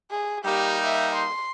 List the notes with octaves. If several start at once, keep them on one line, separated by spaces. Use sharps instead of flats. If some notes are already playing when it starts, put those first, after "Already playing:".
G#4
G3 A#3 D#4 G4
E5
C6